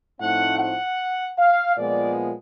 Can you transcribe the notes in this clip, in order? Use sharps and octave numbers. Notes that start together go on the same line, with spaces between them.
A2 F3 A3 C4 D#4 F#5
F#5
F5
A#2 F3 G#3 B3 D5